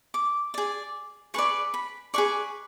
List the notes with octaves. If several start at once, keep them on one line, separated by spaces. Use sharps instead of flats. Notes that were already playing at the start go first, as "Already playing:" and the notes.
D6
G#4 D5
G#4 B4 D5 C#6
B5
G#4 B4 D5 C#6